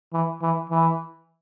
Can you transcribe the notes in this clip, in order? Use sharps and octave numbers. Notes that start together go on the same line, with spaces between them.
E3
E3
E3